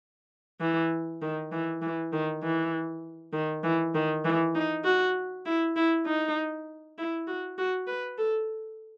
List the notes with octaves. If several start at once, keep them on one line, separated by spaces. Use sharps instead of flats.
E3
D#3
E3
E3
D#3
E3
D#3
E3
D#3
E3
D#4
F#4
E4
E4
D#4
E4
F#4
F#4
B4
A4